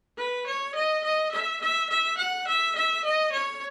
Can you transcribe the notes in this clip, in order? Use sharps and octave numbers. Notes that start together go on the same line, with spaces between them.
B4
C#5
D#5
D#5
E5
E5
E5
F#5
E5
E5
D#5
C#5